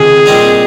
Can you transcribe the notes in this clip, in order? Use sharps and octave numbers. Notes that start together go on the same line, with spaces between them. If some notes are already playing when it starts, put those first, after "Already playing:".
Already playing: C#2 C3 D#3 G#4
A#2 G3 C4 D#4